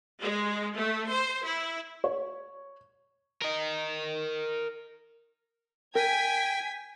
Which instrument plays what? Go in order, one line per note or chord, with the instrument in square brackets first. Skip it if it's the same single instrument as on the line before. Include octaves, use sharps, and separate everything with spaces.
[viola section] G#3
A3
C5
E4
[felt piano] C#5
[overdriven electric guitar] A#4 D#5
[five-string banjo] A#4 [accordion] G5 [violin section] G#5 G#6 B6